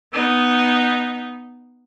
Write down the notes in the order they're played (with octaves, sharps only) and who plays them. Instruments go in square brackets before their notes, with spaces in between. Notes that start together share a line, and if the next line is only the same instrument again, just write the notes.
[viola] B3 D#4